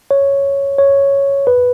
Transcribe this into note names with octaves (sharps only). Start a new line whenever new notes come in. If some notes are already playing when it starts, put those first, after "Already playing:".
C#5
C#5
B4